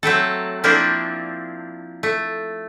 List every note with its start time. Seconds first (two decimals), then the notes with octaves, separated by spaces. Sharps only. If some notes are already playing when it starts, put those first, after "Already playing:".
0.03 F#3 A3 C4 A4
0.64 F3 A#3 C4 D4 E4
2.03 A3